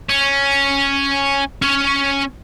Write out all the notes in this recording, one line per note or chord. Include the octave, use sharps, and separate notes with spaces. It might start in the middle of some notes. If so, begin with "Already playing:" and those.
C#4
C#4 C#5